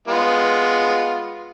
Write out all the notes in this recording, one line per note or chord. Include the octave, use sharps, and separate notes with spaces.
G#3 B3 F4